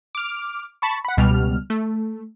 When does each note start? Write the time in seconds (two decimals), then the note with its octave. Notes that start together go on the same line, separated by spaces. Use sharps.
0.15 D6 F6
0.82 A5 B5 C#6
1.05 F#5 B5
1.17 C#2 B2 G3 F6
1.70 A3